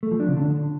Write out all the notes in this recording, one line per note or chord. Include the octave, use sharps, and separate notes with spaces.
A3
F3
D4
C#3
D3